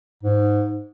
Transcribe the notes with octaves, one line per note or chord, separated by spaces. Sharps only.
G#2